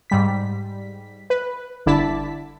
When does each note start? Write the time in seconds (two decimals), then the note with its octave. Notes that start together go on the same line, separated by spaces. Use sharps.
0.10 G#2 G3 B6
1.30 B4
1.86 G1 D3 E4 D5 A5 B6